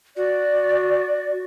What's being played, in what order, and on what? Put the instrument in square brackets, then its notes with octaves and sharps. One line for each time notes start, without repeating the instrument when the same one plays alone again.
[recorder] F#4 [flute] D5